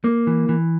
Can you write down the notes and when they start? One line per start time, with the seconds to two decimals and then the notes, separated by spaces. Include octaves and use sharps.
0.04 A#3
0.27 E3
0.49 E3